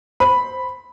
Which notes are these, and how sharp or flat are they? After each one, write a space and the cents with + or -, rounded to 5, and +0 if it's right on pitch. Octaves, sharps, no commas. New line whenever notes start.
C5 +0 B5 +0